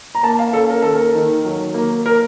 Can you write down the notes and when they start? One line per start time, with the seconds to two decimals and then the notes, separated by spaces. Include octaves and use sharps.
0.15 A#5
0.23 A#3 A5
0.39 F5
0.53 C#4 A4
0.69 A#4
0.82 D#2 A4
0.95 A#4
1.14 D#3
1.44 F#3
1.74 A#3
2.06 A#4